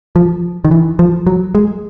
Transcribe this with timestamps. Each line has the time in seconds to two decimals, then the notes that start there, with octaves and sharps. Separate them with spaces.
0.16 F3
0.65 D#3
0.71 E3
0.99 F3
1.27 F#3
1.55 G#3